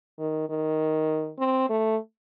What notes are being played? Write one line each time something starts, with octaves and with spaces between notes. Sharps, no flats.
D#3
D#3
C4
A3